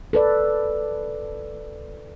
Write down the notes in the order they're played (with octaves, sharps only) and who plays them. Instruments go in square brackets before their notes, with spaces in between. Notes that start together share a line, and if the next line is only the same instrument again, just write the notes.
[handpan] A4 B4 D5